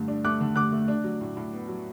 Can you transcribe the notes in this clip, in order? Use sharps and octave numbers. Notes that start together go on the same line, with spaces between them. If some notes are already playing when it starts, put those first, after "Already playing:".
Already playing: G2 D3 A3
D4
A3 D6 F#6
D3
D3 D6 F#6
A3
D4
F#3
A2
A2
B3
F#3